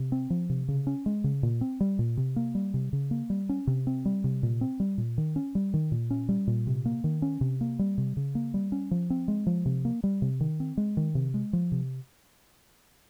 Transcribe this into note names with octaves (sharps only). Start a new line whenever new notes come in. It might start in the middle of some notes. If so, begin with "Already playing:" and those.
Already playing: C3
C4
F3
C3
C#3
C#4
G#3
C#3
A#2
C4
G3
A#2
C3
A#3
G3
C3
C#3
A#3
G3
C#4
C3
C4
G3
C3
A#2
C4
G3
A#2
D#3
C#4
G3
D#3
A#2
C#4
G3
A#2
C3
A#3
D#3
C#4
C3
A#3
G3
C3
C#3
A#3
G3
C#4
F3
C4
G#3
F3
C3
A#3
G3
C3
D#3
C4
G#3
D#3
C3
G#3
F3
C3